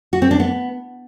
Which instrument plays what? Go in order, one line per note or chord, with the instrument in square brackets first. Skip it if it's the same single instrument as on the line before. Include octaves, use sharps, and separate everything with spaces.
[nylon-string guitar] F#4
C4
D4
B3